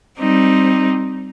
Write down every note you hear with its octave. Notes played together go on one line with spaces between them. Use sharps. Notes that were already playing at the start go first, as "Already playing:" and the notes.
G3 C4 D#4